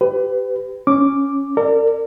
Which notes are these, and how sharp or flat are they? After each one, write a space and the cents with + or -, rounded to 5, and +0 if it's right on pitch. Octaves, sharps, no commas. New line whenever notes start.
G4 +0 B4 +30
C#4 +0 D6 +0
A#4 -40 D5 +0